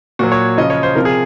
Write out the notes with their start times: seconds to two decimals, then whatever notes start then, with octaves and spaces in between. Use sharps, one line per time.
0.19 A#2 F#3 F#4
0.32 C#5
0.58 C#3 F3 D#5
0.70 C#5
0.83 C5
0.95 C3 F3 A#4
1.05 G#4